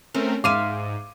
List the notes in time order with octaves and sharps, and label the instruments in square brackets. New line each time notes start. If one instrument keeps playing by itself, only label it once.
[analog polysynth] A3 C4 A#4 [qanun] C#4
[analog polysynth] G#2 [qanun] E5 F5 C6 [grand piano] D6 D#7